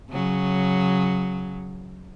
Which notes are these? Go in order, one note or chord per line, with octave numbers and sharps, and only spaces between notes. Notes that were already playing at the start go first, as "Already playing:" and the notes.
C#3 F#3